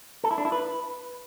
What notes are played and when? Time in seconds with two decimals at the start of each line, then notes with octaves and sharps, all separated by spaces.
0.24 A4
0.31 E4
0.38 D4
0.45 E4
0.52 B4